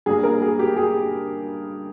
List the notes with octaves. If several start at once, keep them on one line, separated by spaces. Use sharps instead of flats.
G2 G3 A#3 G#4
A#4
G#4
G4
G#4